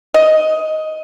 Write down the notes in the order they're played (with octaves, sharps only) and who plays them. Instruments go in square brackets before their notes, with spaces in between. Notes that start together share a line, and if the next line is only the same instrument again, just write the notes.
[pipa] D#5